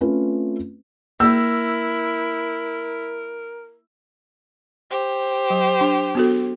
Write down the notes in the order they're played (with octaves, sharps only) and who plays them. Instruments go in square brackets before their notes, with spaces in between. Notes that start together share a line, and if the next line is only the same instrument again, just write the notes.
[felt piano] A3 C4 C#4 F4 B4
[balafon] A#3 [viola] E4 [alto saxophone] A#4 [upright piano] E6
[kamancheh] G4 C5
[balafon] F#3
D4
B3 F#4 A4